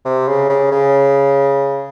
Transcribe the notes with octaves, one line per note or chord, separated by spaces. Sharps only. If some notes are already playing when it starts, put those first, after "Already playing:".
C3
C#3
C#3
C#3